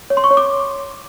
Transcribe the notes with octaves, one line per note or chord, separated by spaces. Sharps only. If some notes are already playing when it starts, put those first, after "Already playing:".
C#5
C6
C#6
C#5
D6